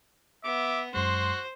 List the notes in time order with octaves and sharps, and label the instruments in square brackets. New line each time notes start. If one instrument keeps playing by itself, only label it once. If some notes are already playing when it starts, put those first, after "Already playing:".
[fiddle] B3 [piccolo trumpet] E5 [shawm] D6
[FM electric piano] F#2 G#3 [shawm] F#4 [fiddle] C5 [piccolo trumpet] C6